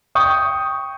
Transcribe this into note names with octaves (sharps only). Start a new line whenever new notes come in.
G5 C#6 D#6 G6